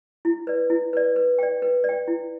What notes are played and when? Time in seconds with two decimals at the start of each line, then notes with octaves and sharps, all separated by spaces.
0.25 E4
0.47 B4 D5
0.70 E4
0.93 B4 D5
1.16 B4
1.39 D5 G5
1.62 B4
1.84 D5 G5
2.08 E4